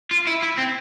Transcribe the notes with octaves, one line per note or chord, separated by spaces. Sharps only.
F4
E4
E4
C4